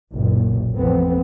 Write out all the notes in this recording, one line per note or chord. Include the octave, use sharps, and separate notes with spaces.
F#1 B1 F#2 A#2
A1 F2 B3 C4